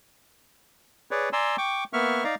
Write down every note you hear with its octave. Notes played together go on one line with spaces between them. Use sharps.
G#4 B4 C#5 D5
D5 G#5 A#5 C6 E6
G5 C#6 D6
A#3 B3 E5 C#6 F6
D#4 D5 F5 A#5